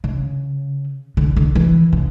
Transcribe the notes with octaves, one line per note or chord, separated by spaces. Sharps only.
C#3
D3
D3
E3
C#3